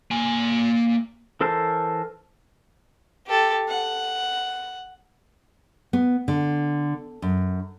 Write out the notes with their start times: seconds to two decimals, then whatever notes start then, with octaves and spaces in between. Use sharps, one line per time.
0.11 A#3 G#5
1.41 E3 A4 A#4 C5 A5
3.27 G4 A4
3.69 F#5
5.93 B3
6.28 D3
7.22 F#2